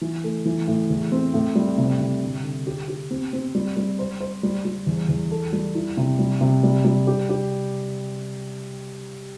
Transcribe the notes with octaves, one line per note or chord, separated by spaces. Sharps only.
E3
A3
E3
A2
E2
C4
A2
G3
C3
C3
D3
D3
G4
G4
C4
C4
G3
G3
C5
C5
G3
G3
E2
E2
A4
G3
E4
C3
G3
C3
G3
G3
G4
G4